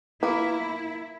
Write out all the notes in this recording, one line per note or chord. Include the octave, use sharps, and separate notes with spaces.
A#3 B3 E4 F4